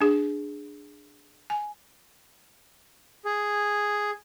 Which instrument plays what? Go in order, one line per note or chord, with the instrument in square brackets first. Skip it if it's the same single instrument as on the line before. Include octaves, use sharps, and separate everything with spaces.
[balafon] D4 G#4
G#5
[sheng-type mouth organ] G#4